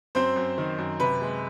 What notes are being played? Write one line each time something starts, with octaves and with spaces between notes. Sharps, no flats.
F#2 C4 C5
F#2
D#3
F#2
C3 B4
G#3